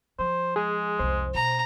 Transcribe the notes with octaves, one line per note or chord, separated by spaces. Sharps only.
F3 C5
G#3 G#4
C2 F2 C5
B2 A#5